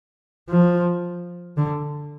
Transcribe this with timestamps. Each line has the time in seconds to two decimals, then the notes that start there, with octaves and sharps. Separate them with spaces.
0.49 F3
1.57 D3